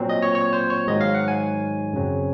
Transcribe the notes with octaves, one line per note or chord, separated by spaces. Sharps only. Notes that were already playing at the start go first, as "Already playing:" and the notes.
Already playing: A#2 F#3 C4
D#5
C#5
C#5
C5
C#5
G#2 D#3 F#3 D#5
F5
F#5
G#5
F#2 C#3 F#3 C4